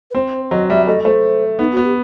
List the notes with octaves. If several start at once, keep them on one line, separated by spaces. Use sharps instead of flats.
B4
C4 C5
F#3 D#5
G3 E5
A3 D#5
A3 C5
B3 D#4
F#4
B3
G4